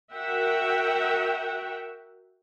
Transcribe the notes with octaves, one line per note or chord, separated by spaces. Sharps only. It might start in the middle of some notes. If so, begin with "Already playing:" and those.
F#4 A#4 E5 F#5 G5